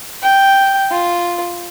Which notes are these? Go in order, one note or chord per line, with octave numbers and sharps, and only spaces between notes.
G5
F4